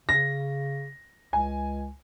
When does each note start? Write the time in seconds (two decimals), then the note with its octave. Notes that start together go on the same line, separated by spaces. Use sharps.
0.09 C#3 A#6
1.33 C#2 G#5